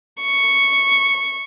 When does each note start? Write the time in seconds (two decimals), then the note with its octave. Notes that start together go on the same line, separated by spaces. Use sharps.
0.23 C#6